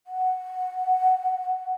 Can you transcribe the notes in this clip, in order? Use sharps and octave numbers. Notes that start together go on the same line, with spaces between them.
F#5